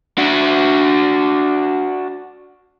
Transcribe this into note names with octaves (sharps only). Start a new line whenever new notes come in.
D4 F#4